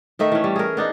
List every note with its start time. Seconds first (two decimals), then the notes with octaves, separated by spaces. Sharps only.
0.19 D#3 A3 D#4 E5
0.32 E3 C#4
0.44 G3
0.56 G#4 A#4
0.77 B3 D4 D#4